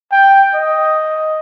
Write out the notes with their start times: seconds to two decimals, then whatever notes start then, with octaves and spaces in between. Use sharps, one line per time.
0.12 G5
0.54 D#5